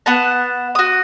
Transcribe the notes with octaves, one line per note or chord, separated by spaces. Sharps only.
B3 F#5 A5
F#4 D#6